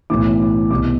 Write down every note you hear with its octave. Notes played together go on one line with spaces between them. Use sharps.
B1 A2 E3 D6
C2 B2 D6